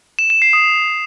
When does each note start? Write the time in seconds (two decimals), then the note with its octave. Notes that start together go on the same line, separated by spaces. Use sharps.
0.19 E7
0.30 E7
0.42 C7
0.53 D#6